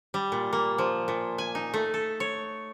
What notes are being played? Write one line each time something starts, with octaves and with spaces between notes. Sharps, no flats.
G3
A#2
A#3
F3
A#2
G#5
D#4
A3
A4
C#5